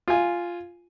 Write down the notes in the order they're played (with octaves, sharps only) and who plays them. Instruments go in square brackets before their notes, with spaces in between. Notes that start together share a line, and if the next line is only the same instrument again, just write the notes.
[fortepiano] F4 G#5